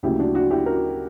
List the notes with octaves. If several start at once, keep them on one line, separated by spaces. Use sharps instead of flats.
D2 C#3 F#3 A#3 E4 G4
D4 F#4
D4 F#4
E4 G4
F#4 A#4